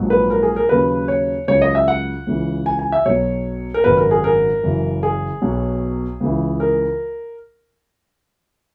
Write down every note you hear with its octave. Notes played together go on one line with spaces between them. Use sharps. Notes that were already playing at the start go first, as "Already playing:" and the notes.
Already playing: A#1 G#2 F#3
B4
A#4
G#4
A#4
D#2 C#3 F#3 B4
C#5
C#2 C#3 F#3 C#5
D#5
E5
F#5
C#2 C#3 E3
G#5
G#5
E5
B1 B2 F#3 C#5
A#4
G#1 F#2 C#3 B4
A#4
G#4
A#4
F#1 F#2 E3
G#4
B1 B2 F#3
C#2 C#3 E3
A#4